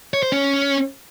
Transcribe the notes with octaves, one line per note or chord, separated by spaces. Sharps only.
C#5
C5
C#4